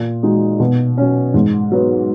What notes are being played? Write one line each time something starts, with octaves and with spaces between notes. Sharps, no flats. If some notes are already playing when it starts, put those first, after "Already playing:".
Already playing: A#2
G#3 D#4 F#4
B2
F#3 C#4
G#2
F#3 B3